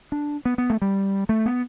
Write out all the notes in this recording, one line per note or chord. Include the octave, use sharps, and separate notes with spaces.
D4
B3
B3
A3
G3
A3
B3